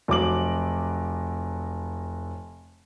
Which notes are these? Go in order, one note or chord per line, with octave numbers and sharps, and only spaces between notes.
F1 F#3 D6 F#7